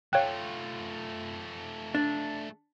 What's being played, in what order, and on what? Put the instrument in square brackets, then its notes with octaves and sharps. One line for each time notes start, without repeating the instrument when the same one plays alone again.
[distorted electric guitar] A3 F4 [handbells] C#5 F#6 [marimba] F5 G5
[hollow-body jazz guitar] D4